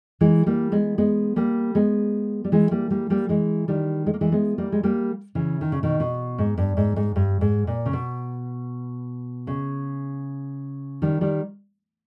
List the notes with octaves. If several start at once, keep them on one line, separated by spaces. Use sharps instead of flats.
E3 G#3
G3 A#3
G#3 B3
G#3 B3
G3 A#3
G#3 B3
G3
E3 G#3
G3 A#3
G3 A#3
G3 A#3
E3 G#3
D#3 G3
G#3
A#3
E3 G#3
G#3 B3
G3 A#3
G#3
G3 A#3
C#3 E3
D#3
C#3
B2 D#3
B2
G#2
G2
G#2
G#2
G2
G#2
A#2
C#3
B2
C#3
D#3 G3
D#3 G3